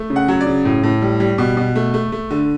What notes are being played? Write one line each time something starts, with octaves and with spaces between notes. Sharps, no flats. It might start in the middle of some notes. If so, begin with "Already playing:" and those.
Already playing: A3
C#3
F#5
F#3
D5
C#3
A2
A2
G3
G3
B2
B2
A3
A3
A3
D3